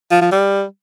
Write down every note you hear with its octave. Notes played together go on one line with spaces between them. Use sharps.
F3
F3
G3